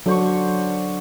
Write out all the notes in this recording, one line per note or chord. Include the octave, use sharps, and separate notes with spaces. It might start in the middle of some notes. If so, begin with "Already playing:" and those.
D3 F#3 C5 C#6